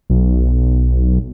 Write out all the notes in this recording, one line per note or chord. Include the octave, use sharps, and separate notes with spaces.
B1